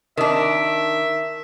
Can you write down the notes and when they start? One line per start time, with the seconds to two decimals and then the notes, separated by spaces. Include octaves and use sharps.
0.17 D#3 D4 A#4 E5